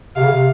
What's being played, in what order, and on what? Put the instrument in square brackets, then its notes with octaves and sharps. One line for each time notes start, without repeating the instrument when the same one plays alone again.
[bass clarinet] C3 [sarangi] F5
[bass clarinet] C#3
C3